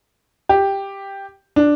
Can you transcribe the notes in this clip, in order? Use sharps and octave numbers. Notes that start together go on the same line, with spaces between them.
G4
D4